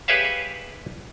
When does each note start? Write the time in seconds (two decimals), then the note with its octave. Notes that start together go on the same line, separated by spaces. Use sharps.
0.08 G4 G#4 B4 C#5 E5 F5